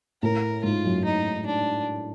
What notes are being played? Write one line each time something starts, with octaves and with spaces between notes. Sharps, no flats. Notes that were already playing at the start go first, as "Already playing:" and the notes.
A2 A#4
G#2 F4
F#2
D#4
D4